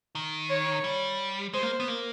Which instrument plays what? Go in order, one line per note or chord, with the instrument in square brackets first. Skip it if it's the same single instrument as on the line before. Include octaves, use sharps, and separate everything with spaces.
[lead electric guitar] D#3
[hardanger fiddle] C#5
[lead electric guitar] G3
[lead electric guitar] G#3 [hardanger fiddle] C5
[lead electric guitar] A#3
B3
A#3